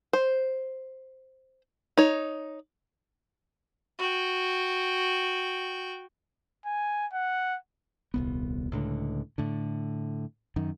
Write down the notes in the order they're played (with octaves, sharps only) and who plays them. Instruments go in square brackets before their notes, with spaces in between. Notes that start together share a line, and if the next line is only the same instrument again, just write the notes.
[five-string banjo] C5
D#4 C#5
[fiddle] F#4 G5
[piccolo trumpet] G#5
F#5
[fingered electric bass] D#1 C2 B3
C#2 A2 D3
A2 D3
F#2 D#3